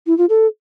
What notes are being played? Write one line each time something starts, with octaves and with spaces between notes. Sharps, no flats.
E4
F4
A4